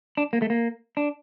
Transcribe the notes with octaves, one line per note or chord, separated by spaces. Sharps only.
D4
A#3
A3
A#3
D4